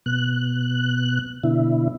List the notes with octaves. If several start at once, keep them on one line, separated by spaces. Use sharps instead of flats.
B2 F#6
B2 D3 E4